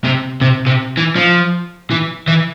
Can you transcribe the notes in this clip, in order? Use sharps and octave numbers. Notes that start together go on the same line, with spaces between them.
C3
C3
C3
E3
F3
E3
E3